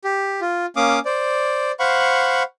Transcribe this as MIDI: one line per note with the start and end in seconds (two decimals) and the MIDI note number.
0.04 0.40 67
0.41 0.66 65
0.76 0.99 58
0.76 0.99 61
0.76 0.99 77
0.76 0.99 86
0.76 0.99 87
1.05 1.72 72
1.05 1.72 74
1.80 2.43 72
1.80 2.43 77
1.80 2.43 78
1.80 2.43 83
1.80 2.43 85